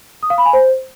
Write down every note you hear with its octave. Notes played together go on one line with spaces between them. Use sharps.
D#6
F5
B5
G#5
C5